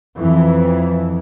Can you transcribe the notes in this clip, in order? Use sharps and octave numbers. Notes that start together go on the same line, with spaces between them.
F2 E3